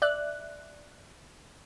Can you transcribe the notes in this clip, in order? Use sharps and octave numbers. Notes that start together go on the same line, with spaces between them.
D5 E5 F#6